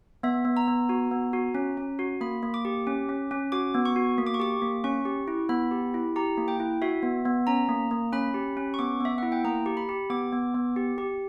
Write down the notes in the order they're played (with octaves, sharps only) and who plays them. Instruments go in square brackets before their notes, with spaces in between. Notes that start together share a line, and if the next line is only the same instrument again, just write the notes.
[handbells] B3 E5
B3
A#5
B3
F#4
B3
F#4
C#4
C#4
F#4
A#3 B5
A#3
D6
G4
C#4
C#4
C#4
F#4 D6
B3
C#6
F#4
A#3
D6
C#6
G4 D6
A#3
C#4 C#6
G4
E4
B3 B5
G4
E4
G4 A#5
A#3
G5
E4
F#4 E5
B3
B3
C#4 A#5
A#3
A#3
C#4 B5
G4
C#4
C#6
B3 D6
B3 E5
E4 F#5
G5
A#3 A#5
G4
B5
G4
B3 D6
B3
B3
G4
G4